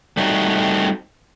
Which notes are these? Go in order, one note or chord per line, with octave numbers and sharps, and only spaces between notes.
G3 A3 C4 D#4 F#4